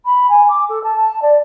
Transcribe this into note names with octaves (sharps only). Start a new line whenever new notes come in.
B5
G#5
D6
A4
A5
A5
D5